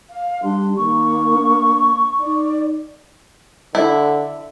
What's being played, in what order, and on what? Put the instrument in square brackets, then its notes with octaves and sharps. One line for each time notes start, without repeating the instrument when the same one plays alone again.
[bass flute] F5
[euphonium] G3 [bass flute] D4 [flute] C6
[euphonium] D#3 [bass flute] A#3 [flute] C#6
[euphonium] D4
[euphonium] D#4 [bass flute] D5
[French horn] D3 [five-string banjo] E4